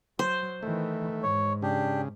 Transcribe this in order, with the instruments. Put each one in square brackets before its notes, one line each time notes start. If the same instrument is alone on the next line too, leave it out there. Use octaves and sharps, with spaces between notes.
[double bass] F#3 [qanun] C5
[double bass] D#3 E3 [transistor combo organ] A3
[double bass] G#2 [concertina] C#5
[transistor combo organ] C#3 [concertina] D4 G4